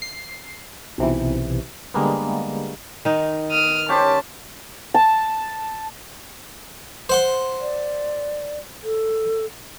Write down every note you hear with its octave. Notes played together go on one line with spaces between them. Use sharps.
C7
B1 C3 E3
D3 G3 G#3 A#3 B3
D#3 D#4
D#6 F6
C#4 G4 C5 A5
A5
C5 F#5 C6
D5
A4